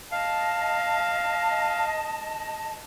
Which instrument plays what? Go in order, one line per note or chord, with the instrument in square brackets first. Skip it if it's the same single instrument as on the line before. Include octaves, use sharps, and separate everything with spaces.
[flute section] D#5 A5 [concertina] F5